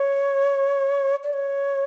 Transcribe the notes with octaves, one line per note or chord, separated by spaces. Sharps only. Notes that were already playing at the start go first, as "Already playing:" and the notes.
Already playing: C#5
D5
C#5